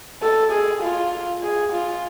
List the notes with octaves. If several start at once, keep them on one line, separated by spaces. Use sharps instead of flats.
A4
G#4
F4
G#4
F4